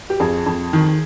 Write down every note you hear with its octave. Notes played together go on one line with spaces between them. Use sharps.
G4
F2 G#4
F2
D#3